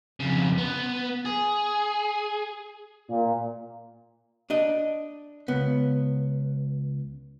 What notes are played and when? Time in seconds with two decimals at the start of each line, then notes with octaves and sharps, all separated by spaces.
0.20 F2 C#3
0.58 B3
1.25 G#4
3.09 A#2
4.50 D4 D#5
5.48 C#2 B3